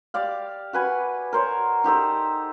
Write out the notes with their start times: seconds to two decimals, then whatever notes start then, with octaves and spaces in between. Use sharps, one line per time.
0.14 G4 D5 F5
0.73 F#4 B4 G#5
1.33 A#4 C5 C#5
1.84 D#4 G4 A4 C5